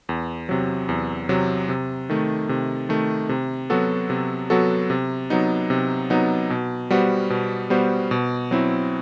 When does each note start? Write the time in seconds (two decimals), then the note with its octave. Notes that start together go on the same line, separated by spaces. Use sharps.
0.09 E2
0.49 C3 F#3
0.89 E2
1.29 C3 F#3
1.69 C3
2.10 D#3 A3
2.49 C3
2.89 D#3 A3
3.29 C3
3.70 F#3 B3 F#4 A4
4.10 C3
4.50 F#3 B3 F#4 A4
4.90 C3
5.30 F#3 B3 D#4
5.70 C3
6.10 F#3 B3 D#4
6.50 B2
6.90 G3 B3 F#4 C5
7.30 B2
7.70 G3 B3 F#4 C5
8.11 B2
8.51 F#3 C4 E4